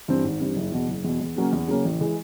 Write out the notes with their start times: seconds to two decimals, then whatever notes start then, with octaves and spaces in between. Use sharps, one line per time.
0.08 G2 E3 G3 C4
0.24 G#1
0.40 G2 E3 G3 C4
0.56 F#1
0.72 E2 B2
0.88 F#1
1.05 E2 B2
1.21 E2
1.36 C#3 F#3 A#3 C#4
1.53 E2
1.68 C#3 F#3 A#3 C#4
1.85 A1
2.01 E3 G#3